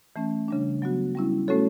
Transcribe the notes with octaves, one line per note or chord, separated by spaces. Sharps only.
E3 A3 C#4
C#3 G3 D4
F#3 B3 F#4
G3 C#4 E4
A3 C#4 F#4 A4 C#5